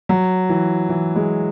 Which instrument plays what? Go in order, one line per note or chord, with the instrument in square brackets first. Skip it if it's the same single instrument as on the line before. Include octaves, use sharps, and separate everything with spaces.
[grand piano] F#3
E3
E3
G#3